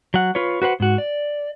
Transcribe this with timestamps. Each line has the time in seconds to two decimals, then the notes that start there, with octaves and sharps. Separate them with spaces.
0.14 F#3 F#5
0.35 F4 B4 C#5
0.62 F#4 B4 C5 F#5
0.80 G#2 F#4
0.98 D5